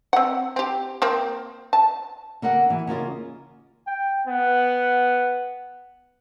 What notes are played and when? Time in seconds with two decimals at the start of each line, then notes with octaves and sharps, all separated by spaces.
0.13 C4 F#5
0.56 C4 G4
1.02 A#3 C4
1.73 A5
2.42 D3 A#3 A#4 F#5
2.70 E3
2.87 C#3 A#3 F4 D#5
3.87 G5
4.27 B3